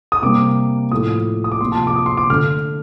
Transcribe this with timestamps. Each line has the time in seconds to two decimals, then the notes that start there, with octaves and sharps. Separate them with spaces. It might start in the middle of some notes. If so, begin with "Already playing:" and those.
0.12 D#6
0.22 C3 G3 A#3 D6
0.92 A2 F3 A3 D#6
1.44 D#6
1.52 D6
1.61 C3 F3 A#3 C6
1.72 A5
1.87 D6
1.96 D#6
2.06 C6
2.17 D6
2.30 D3 A3 F6